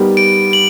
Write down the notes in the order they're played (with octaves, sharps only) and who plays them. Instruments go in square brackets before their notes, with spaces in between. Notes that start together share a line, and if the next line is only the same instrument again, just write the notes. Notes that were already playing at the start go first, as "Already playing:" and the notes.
Already playing: [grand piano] G3 B3 D#4 G4 A#4
[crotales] D7
F#7